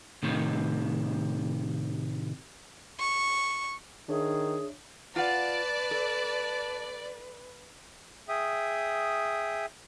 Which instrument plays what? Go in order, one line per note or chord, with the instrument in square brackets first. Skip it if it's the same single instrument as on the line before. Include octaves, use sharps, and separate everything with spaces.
[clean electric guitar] A2 C3 D#3
[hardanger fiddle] C#6
[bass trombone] D#3 [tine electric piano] D4 C#5 E5 [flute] G#4
[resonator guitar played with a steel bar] F4 F5 F#5 [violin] B4 [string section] D5 [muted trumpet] A5
[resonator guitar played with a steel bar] A4
[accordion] G#4 E5 G5 D#6